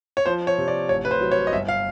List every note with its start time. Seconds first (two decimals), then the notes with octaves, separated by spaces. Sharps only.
0.17 C#5
0.26 F3 C5
0.47 C#5
0.58 C3
0.68 D5
0.89 A1 C#5
1.05 B4
1.11 C5
1.21 F#3
1.31 C#5
1.47 D#5
1.53 G1 E5
1.68 F5